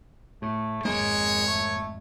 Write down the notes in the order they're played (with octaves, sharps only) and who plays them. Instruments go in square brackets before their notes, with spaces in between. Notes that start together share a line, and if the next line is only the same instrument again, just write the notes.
[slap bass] A2 [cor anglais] A3
[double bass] G#1 F2 [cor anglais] G#3 [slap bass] A#3 [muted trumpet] C#5
[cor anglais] A3